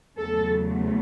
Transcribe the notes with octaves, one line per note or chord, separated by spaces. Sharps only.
E2 C#3 F#3 A3 A4